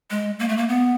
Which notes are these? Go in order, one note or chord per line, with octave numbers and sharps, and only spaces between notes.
G#3
A#3
A3
A#3
B3